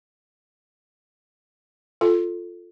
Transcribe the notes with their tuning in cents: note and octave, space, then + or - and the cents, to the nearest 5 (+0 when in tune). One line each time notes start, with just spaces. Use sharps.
F4 +0 A4 +0